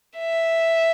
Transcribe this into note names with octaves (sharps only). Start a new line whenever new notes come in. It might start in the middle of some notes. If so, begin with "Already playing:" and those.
E5